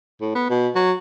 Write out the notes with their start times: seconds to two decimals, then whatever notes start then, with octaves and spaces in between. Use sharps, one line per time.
0.21 A2
0.35 B3
0.50 B2
0.76 F#3